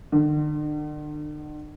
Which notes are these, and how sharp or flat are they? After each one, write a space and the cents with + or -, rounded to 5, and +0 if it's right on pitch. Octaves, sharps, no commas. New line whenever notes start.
D3 +40